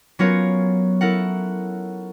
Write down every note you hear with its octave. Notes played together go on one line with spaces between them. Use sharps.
F#3 B3 C#4 F4 A#4 C#5
E4 A4 A#4 F#5